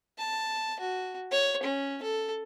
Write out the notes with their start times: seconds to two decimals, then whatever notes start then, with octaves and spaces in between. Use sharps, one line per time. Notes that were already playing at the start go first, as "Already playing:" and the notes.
0.18 A5
0.80 F#4
1.31 C#5
1.63 C#4
2.03 A4